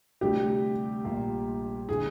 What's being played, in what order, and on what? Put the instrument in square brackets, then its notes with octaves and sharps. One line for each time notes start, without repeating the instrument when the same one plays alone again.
[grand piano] D2 C3 G3 D4 F4 [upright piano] G4
[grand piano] A#1 A#2 G3 A#3 F4
[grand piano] D3 G#3 [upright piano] G#4